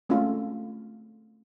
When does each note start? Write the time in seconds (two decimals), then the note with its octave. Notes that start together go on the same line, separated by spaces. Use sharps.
0.09 G#3 A3 C4 C#4 F4 A4